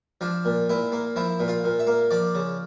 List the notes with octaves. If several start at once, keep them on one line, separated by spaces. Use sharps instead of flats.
F3 D4
A#2
A#2 E4
A#3
F3 E4
A#2
F4
A#2
E5
A#3
F3 D5
C#3